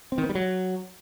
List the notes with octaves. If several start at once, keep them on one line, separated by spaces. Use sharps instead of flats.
C4
D#3
B3
G3
F#3